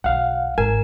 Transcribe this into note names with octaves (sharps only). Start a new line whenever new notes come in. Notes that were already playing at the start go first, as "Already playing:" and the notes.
B1 B3 F5 F#5
G#1 G#2 A#4 G#5